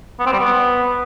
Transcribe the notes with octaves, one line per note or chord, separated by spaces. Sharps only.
B3
C4
G3
B3